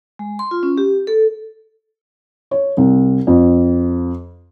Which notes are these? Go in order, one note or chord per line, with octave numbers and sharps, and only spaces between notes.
G#3
C6
F4
C#4
G4
A4
C#5
C2
F2